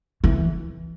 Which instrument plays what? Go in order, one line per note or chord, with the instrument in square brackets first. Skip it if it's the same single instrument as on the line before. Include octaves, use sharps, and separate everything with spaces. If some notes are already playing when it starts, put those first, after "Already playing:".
[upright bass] E3